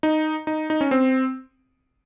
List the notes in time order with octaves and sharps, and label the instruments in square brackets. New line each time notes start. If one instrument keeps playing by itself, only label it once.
[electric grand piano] D#4
D#4
D#4
C#4
C4